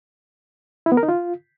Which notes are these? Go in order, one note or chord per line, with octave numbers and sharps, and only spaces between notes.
E4
B3
A#4
D#4
F4